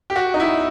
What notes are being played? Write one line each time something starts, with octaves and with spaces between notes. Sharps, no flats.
G4
F#4
D#4
E4